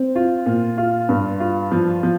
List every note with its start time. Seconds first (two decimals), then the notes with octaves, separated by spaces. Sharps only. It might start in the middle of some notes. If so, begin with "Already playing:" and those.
Already playing: C4
0.15 F4
0.46 A#2
0.77 F4
1.09 G2
1.40 F4
1.71 F3
2.03 F3